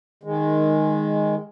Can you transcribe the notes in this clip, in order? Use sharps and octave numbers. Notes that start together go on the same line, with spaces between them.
D#3 G#3